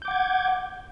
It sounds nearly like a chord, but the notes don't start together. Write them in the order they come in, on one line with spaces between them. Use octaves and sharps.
G6 D6 F#5 G#6